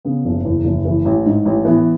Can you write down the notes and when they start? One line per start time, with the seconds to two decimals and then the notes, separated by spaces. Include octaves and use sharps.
0.05 C#3 B3
0.25 F#1
0.45 E2
0.65 F#1
0.85 E3
1.05 A1
1.26 G#2
1.45 A1
1.65 E3 B3